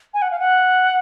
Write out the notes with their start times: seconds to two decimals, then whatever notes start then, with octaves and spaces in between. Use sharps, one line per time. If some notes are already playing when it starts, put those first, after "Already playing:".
0.14 G#5
0.22 F#5
0.31 F5
0.39 F#5